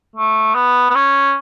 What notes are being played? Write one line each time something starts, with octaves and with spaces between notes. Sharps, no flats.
A3
B3
B3
C#4